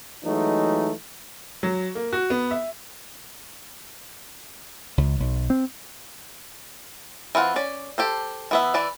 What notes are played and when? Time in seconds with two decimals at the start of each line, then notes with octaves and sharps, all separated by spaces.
0.24 E3 F#3 G#3 A3 D#4
1.63 F#3
1.95 A#3
2.13 F#4
2.30 B3
2.51 E5
4.98 C#2
5.20 B1
5.50 C4
7.35 E3 C4 F4 F#5
7.56 C#4 D5
7.98 G4 A4 C5
8.51 E3 B3 E5
8.74 E3 D5 E5